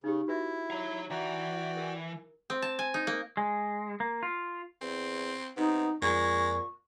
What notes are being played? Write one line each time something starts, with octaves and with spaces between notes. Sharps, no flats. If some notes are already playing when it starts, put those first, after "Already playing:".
C#3 D#4 G4
E4 F#4 B4 E5
C#5 A#5
E3 F#4 D5 G5 A#5
A#4
C4
A5
G#5
D#4
A#3
G#3
A#3
F4
E2 C4
C3 B3 D#4
F2 A#2 G#3 C#6